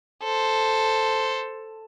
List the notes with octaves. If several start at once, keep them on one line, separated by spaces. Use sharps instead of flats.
A4 C5